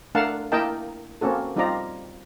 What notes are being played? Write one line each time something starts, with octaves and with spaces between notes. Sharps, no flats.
A3 D4 A#4 F5 F#5 A5
A#3 E4 A#4 D#5 G5 A5
A#3 C4 C#4 F#4 A4
G3 C4 D#4 F4 D5 A#5